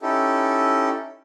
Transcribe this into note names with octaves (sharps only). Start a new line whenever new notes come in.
C#4 D#4 E4 G4 A4